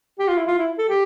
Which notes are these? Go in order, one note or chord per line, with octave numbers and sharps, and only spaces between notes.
G4
F4
E4
F4
E4
A4
G4